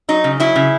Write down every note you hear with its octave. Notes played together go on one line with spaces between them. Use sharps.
F#3 D#4
C#3
F#3 E4
C#3